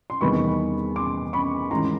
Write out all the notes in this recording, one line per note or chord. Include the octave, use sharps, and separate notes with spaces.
C6
E2 C3 D#3 G3 B3 B5 C#6
C6 D6
B5 C#6
A1 G#2 D#3 A#5 C6